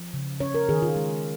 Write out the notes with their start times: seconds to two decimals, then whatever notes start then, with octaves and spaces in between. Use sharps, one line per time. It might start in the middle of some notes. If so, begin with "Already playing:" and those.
Already playing: F3
0.14 C#3
0.40 C#4 C#5
0.54 A#4
0.69 D#3 G#4
0.82 F4
0.96 G#3